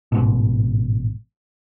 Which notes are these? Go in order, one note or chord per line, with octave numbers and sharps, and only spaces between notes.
A1 G#2 B2